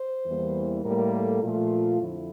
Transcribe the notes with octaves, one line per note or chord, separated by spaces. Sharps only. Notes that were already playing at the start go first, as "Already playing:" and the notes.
Already playing: C5
E2 E3 G3 A#3
A2 G3 A#3 A#4
A4
A#2 F3 A3 F4
F2 D3 F3 E4